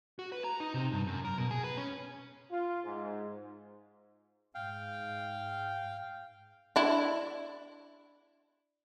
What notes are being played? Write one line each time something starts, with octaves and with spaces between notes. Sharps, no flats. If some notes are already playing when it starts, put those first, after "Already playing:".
F#4
B4
A#5
D#4
C3
G2
F#2
A#4
B2
G#4
B4
C#4
F4
G#2
G#2 F5 G5
D4 E4